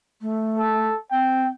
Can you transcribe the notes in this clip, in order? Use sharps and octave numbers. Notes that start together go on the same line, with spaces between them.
A3
A4
C4 G5